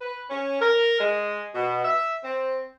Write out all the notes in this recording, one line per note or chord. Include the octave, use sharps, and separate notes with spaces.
B4
C#4
A#4
G#3
B2
E5
C4